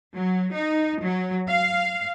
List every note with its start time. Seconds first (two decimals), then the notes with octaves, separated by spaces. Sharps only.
0.16 F#3
0.53 D#4
1.03 F#3
1.49 F5